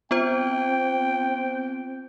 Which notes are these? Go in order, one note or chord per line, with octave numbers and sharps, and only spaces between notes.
B3 C4 F4 C5 G5